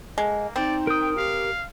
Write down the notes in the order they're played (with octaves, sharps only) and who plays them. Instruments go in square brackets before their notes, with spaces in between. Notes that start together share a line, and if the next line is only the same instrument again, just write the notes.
[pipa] G#3 [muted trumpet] A#3
[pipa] C4 [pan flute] D#4 [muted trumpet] D5
[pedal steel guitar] A#4 D#6 [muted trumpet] G5
[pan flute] G4 [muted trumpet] F5